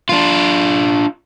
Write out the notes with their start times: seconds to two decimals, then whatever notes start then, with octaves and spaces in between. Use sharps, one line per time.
0.09 D4 F4